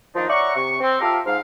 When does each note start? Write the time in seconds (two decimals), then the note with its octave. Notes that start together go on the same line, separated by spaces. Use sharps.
0.15 D#3 F3 A#3 D4 D#4
0.30 C#5 D5 E5 F#5 A#5 C#6
0.56 C3 C#6
0.81 C4
1.01 F4 G4 A4 A#4 E5 F5
1.26 G#2 F5